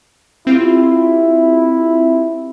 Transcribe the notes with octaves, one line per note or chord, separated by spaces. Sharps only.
C4 E4 F4 G4